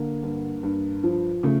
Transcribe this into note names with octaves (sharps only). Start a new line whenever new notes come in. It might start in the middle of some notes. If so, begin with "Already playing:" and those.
Already playing: D3 A#3
G2
G2
F3
C#3 A3